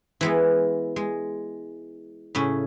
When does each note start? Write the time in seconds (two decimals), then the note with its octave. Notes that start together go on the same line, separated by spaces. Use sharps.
0.21 E3 G#3 B3
0.96 G#3
2.35 A2 C#3 C#4